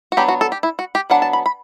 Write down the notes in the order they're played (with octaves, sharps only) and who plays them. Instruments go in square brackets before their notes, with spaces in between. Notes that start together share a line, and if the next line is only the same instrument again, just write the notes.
[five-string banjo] F#4
F#3 B3 D4 G4
F#4
A4
G4
E4
F#4
G4
F#3 B3 D4 F#5
A5
B5
B5